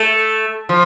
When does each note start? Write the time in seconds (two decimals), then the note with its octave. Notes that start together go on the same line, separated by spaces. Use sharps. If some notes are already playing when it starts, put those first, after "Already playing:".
Already playing: A3
0.69 F3